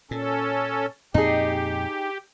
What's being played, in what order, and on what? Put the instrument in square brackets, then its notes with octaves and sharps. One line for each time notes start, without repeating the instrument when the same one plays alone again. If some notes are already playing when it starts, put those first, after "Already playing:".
[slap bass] A#2 [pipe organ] C#4 A4
[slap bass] F2 A#2 C4 [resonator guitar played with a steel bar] D#4 G#4 [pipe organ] G4